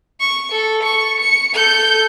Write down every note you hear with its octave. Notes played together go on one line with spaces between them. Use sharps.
C#6
A4
C#6
C#7
A4 G6